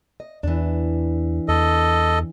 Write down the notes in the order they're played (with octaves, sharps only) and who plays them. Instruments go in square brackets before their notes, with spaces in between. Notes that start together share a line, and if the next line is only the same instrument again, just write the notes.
[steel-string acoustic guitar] D#5
[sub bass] E2 [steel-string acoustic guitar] E3 D4
[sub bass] E2 [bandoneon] A4 D#5